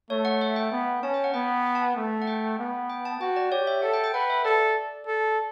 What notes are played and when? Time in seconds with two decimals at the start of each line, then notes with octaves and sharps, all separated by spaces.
0.10 A3 C#5
0.25 F#5
0.41 E5
0.56 G5
0.71 B3
1.03 C#4 A5
1.14 G5
1.24 F#5
1.34 B3 G5
1.65 G5
1.75 A5
1.86 A5
1.96 A3
2.22 F#5
2.27 G5
2.59 B3
2.90 G5
3.05 A5
3.20 F#4 G5
3.36 D5
3.52 G4 C#5
3.67 E5
3.82 A4 F#5
3.93 G5
4.04 G5
4.13 B4 F#5
4.30 E5
4.44 A4 D5
5.07 A4